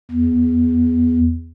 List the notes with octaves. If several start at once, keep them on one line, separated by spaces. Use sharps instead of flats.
E2